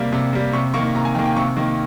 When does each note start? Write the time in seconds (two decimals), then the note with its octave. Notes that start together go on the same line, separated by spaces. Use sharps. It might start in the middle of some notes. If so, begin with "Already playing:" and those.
Already playing: C3 G3 A#3
0.12 C3
0.33 G3 A#3
0.53 C3 C#6
0.74 D#3 A#3 C#6
0.95 C3 A#5
1.05 G#5
1.15 D#3 A#3 G5
1.26 G5
1.36 C3 C#6
1.56 D#3 A#3